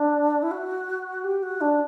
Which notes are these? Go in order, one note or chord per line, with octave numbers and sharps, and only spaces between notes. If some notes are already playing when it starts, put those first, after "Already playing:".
Already playing: D4
E4
F#4
G4
F#4
D4